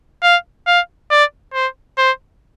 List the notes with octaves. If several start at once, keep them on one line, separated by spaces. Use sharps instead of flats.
F5
F5
D5
C5
C5